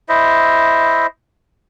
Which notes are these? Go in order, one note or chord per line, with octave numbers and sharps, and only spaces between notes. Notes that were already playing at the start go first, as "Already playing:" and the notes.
E4 C5 D#5 E5